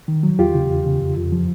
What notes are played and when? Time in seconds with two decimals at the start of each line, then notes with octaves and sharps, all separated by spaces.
0.08 D#3
0.23 F#3
0.39 E2 F4 G4
0.54 C#3
0.70 E2
0.86 C#3
1.01 F2
1.17 F2
1.32 F3